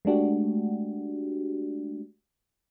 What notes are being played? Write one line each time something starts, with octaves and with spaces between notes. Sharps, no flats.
G#3 A3 D4 F#4 G4